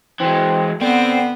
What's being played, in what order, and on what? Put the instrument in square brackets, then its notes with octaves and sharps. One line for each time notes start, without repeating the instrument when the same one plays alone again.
[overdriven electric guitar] E3 G#3 [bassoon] C4
[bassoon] D3 [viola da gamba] B3 [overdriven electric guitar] C4